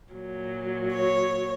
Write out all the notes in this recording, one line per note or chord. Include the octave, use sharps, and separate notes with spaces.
A#2 F#3
C#5